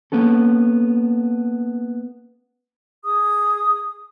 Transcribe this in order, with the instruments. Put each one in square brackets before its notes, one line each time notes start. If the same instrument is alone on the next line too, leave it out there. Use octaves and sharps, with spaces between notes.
[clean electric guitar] A#3 B3 C#4 A4
[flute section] G#4 D#6